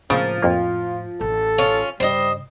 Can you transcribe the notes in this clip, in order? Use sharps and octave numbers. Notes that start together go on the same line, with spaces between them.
A2 C#3 F3 A#3 C4
F2 A#3 F4
A1 A4
C#4 F4
G2 C#3 G3 C5 D#5